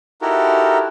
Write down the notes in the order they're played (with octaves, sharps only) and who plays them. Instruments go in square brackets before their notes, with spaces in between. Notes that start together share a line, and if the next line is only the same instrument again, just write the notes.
[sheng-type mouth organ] D#4 E4 F#4 G4 A4 A#4